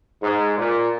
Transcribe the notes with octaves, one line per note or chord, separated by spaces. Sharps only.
G#2
A#2